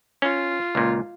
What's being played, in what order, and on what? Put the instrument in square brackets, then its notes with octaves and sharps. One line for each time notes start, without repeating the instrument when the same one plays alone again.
[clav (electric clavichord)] C#4 [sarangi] F4
[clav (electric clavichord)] C#2 A#2